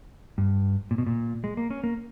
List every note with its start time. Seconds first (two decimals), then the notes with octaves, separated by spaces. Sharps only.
0.38 G2
0.91 A#2
0.98 B2
1.07 A#2
1.44 G#3
1.57 A#3
1.70 C#4
1.84 A#3